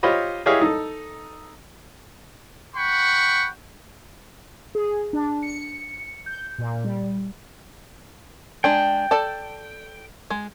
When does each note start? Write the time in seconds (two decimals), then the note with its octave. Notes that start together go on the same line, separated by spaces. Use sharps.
0.03 F4 G4 C5 C#5 D#5 B5
0.46 E4 G4 G#4 C#5 D#5 F5
0.61 D#4 A4
2.76 F#5 G5 B5 C#6
4.75 G#4
5.13 D4
5.43 C#7
6.26 G6
6.58 A#2
6.84 G3
8.64 G#3 D4 G5 G#5
9.11 A4 D5 A5
10.30 G#3